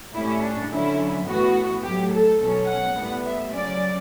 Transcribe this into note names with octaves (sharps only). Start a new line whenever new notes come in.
A2 G3 C#4 E4
D4
D3 F#3 C#4 E4
A2 E3 B3 F#4
A2 F#3 A3 G4
A4
B2 F#3 C#4
F#5
A2 G3 B3
E5
C#3 F#3 C#4 D5